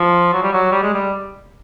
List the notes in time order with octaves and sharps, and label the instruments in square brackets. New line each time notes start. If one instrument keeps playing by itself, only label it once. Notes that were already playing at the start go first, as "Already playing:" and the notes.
Already playing: [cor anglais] F3
F#3
G3
F#3
G3
G#3
G3